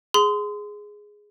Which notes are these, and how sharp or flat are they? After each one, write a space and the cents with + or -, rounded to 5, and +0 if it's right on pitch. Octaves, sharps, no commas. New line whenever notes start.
G#4 +0 C6 -25